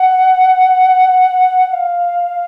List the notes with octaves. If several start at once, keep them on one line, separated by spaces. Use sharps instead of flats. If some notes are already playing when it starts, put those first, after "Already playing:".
Already playing: F#5
F#5
F5